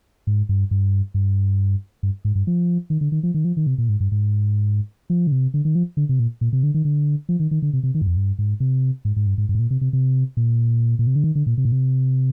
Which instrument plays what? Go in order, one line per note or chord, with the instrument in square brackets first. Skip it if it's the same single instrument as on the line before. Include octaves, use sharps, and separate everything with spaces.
[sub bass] G#2
G2
G2
G2
G2
G#2
G2
F3
D#3
D3
D#3
F3
D#3
F3
D#3
C3
A#2
G#2
G2
G#2
F3
D3
C3
D3
D#3
F3
D3
C3
A#2
A#2
C3
D3
D#3
D3
F3
D#3
D#3
D3
C3
C3
D#3
G2
F2
G2
G#2
C3
G#2
G#2
G2
G#2
G2
G#2
A#2
C3
C3
C3
A#2
A#2
C3
D3
D#3
D3
A#2
C3
A#2
C3